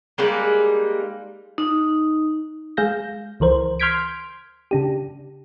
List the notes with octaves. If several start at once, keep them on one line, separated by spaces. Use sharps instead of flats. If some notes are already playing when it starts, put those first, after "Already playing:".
G3 G#3 A#3 D#4
D#4
G#3 G#4 F5 G6 A#6
C#2 E3 A#4 C5
C6 F6 G6 G#6 B6 D7
C#3 D4 G4